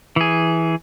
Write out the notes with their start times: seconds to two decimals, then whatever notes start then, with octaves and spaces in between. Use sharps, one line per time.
0.16 E3 G#4